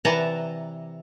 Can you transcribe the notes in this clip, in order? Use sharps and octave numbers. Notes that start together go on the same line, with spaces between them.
C3 E3 D5 F#5 A5 A#5